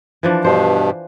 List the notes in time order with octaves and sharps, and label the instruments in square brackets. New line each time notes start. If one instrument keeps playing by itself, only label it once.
[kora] E3 F3 D4
[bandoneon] G2 B2 [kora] C5